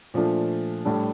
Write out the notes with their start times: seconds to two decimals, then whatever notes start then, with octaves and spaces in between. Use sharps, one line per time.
0.14 A#2 F3 A3 D4
0.85 A2 G3 D4 A4